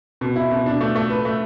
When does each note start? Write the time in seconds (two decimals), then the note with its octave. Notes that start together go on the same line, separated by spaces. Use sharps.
0.21 B2
0.36 E4
0.51 B2
0.66 D4
0.81 A3
0.96 A3
1.10 B4
1.25 A3